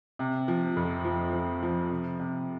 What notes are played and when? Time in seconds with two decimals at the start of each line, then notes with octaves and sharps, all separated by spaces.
0.19 C3
0.48 F3
0.77 F2
1.05 F3
1.33 F3
1.63 F3
1.91 C3
2.20 C3